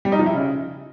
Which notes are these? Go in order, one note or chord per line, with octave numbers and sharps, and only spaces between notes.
G3
D#4
F3
E4
C#3